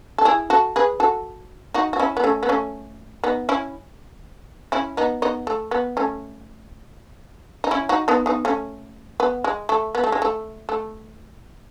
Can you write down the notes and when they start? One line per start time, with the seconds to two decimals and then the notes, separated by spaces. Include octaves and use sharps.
0.18 A4
0.25 E4 G#4
0.50 F#4 A4
0.76 G#4 B4
1.00 F#4 A4
1.74 D#4 F#4
1.93 F#4
2.00 C#4 E4
2.17 B3
2.24 A3 C#4
2.43 B3
2.49 A3 C#4
3.24 B3 D#4
3.49 C#4 E4
4.72 C#4 E4
4.97 B3 D#4
5.22 B3 D#4
5.47 A3
5.71 B3
5.97 A3 C#4
7.64 D#4
7.71 C#4 E4
7.89 D#4 F#4
8.08 B3 D#4
8.26 B3 D#4
8.45 A3 C#4
9.20 B3
9.44 G#3
9.69 A3
9.95 B3
10.04 A3
10.12 G#3
10.22 A3
10.69 A3